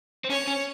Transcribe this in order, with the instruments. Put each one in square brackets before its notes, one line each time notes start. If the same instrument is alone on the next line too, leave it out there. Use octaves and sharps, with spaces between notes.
[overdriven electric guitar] C4
[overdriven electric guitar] C#4 [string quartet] C#5
[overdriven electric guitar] C#4